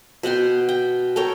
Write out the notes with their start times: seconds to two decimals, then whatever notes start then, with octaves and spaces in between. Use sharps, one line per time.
0.23 B2 F#5 G5 C6
0.69 G5
1.16 A4 A#4 C#5 G5